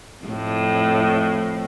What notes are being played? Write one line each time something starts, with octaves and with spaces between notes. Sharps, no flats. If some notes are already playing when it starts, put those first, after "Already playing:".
F2 A2